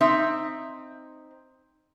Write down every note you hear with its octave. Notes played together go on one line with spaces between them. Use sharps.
C4 D#4 E5